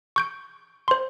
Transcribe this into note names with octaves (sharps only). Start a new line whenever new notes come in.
C#6 G6 D7
C5 C6